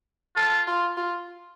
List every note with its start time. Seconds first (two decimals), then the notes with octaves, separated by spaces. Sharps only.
0.36 F4 A4
0.67 F4
0.97 F4